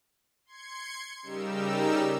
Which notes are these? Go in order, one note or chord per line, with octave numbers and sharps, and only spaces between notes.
C6 G#6 C#7
C#3 G3 D#4 G4 A#4 E6